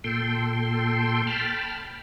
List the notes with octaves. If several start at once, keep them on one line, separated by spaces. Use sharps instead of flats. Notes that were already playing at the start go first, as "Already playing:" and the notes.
A#2 A4 G5 C6
G5 A5 B5 F6